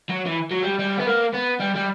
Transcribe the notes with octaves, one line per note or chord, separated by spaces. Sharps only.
F#3
E3
F#3
G3
G3
B3
A#3
B3
G3
G3